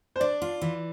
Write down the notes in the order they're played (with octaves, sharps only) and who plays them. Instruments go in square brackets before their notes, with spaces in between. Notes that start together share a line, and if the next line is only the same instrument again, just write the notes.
[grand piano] C5
[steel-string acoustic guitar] D4 [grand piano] D5
[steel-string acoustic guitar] F4
E3